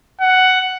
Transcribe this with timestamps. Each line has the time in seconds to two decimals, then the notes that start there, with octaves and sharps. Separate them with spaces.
0.21 F#5